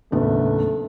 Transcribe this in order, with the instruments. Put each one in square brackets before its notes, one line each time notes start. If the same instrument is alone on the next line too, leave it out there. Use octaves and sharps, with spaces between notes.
[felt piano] F#1 B3 [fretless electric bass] D#2 A2 D4 [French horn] A3